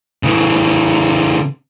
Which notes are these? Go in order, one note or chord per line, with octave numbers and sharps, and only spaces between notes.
C#3 E3